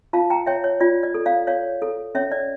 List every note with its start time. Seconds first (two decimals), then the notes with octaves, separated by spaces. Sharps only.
0.13 F4 F5 A5
0.30 G5 A#5
0.46 C#5 E5 G5
0.64 C#5
0.80 F4 D5
1.03 D5
1.14 A4
1.26 D5 F5
1.47 C#5 D5 F5
1.82 A4
2.15 C#4 C#5 E5
2.31 D5